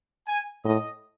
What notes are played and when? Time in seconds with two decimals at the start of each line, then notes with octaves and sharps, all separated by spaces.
0.28 G#5
0.65 A2 D#5